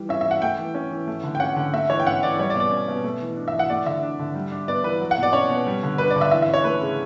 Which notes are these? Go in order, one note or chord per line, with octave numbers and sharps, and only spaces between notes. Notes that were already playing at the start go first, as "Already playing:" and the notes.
Already playing: E3 G3
C#4 E5
E3 E5
F#5
A3 G5
E3
C#4
E3
A3
D3
G5
C#4 F#5
D3
A3 E5
E3 C#5
G5
C#4 F#5
E3 D5
G3 C#5
D5
B2
D5
C#4
B2
A3
E3
D4
E5
E3
F#5
A3 D5
D3 E5
D4
D3
G3
D4
B3 D5
E3 B4
F#3
F#5
B2
D5
C#4 C#5
B2
G3
D3
D4 B4
D5
D3
E5
E3 E5
E5
C#4
C#5
A3 B4
C#3